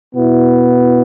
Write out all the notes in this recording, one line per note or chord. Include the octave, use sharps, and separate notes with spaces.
B2 B3 E4